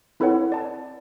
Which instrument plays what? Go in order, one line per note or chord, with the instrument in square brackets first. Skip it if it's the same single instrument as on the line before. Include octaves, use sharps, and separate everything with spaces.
[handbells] C4 E4 A4 B4 C#5 F#5
D5 A5